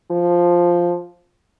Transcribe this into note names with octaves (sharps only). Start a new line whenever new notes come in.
F3